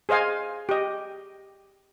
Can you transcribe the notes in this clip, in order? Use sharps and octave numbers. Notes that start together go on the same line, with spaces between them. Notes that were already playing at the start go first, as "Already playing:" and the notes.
G#4 C5 D#5 F5 G#5
G4 D#5